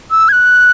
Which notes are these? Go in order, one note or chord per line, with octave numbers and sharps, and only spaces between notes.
E6
G#6
F#6